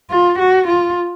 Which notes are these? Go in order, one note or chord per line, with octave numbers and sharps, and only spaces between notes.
F4
F#4
F4